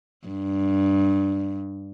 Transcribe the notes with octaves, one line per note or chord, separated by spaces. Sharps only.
G2